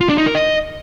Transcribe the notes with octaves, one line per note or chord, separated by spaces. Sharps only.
F4
D4
D#4
A#4
D#5